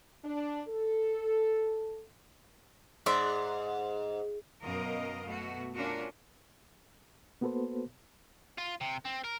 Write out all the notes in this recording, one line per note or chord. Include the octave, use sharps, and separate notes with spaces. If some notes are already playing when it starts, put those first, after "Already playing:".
D4
A4
G#2 D5 E5 C6
F#2 B2 A#4 D#5 F5
B2 A3 F#4
C#4 D4 F4 F#4 A#4
A#3 B3 F#4 A4 B4 C5
F4
C3
C4
A#4